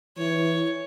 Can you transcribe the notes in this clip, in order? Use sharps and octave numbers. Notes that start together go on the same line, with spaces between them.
E3 C#5